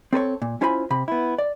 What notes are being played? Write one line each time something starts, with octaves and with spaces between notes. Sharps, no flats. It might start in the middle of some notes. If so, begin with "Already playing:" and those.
C4 A4 B4 C#5
A#2
C#4 E4 F4 C5 G#5 B5
C3 B5
B3 E4
D5